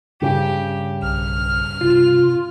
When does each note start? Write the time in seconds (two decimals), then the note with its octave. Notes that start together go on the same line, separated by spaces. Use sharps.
0.22 G2 C#3 G4
1.02 B1 F6
1.81 C3 F4